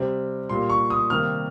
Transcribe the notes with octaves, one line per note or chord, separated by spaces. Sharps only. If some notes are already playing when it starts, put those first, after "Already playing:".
Already playing: C3 G3 C4
A#2 G3 A#3 C6
C#6
D#6
C3 D#3 G3 A#3 F6